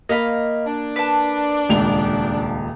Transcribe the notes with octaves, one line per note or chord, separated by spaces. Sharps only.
A#3 D#5 F5 B5
D4
B4 A5
D#1 C#2 F7